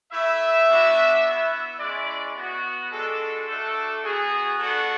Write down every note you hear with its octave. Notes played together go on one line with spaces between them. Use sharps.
A3 E4 E5
B3 D4 F#4
B3 E4
G#3 C#4 E4 D5
B3 F#4
G#3 D4 F#4 A4
A3 D4 F#4 A4
B3 F#4 G#4
B3 D4 F#4 A4